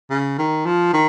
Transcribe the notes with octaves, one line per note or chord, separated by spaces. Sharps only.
C#3
D#3
F3
D#3